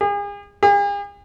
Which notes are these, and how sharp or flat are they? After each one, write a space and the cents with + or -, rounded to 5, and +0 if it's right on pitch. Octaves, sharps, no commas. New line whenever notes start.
G#4 -40
G#4 -45